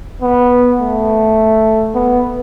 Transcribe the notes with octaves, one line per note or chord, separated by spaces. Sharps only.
B3
A3
B3